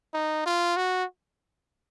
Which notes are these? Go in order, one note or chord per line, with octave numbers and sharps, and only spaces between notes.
D#4
F4
F#4